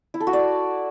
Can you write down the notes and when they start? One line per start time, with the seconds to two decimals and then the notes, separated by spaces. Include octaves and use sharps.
0.14 E4
0.20 A4
0.27 F#4
0.33 D5